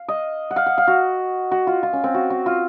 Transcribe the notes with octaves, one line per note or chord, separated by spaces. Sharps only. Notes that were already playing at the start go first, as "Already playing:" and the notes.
Already playing: F5
D#5
F#5
F5
F#5
F5
F#4
F#4
F4
F4
C#4
C4
F#4
F#4
F4